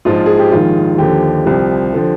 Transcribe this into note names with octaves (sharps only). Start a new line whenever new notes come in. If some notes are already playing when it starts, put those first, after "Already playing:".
A#1 G#2 F3 F4
G#4
G4
A#1 G#2 D#3 F4
D#2 D3 F3 G4
C2 C3 F3
D3 F3